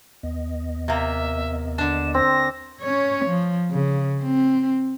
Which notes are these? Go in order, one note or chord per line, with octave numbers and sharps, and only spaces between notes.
D#2 B3 D#5
C3 A#3 E5
D3 D4 E7
C4 A#6
C#4 C#5
F3
C#3
C4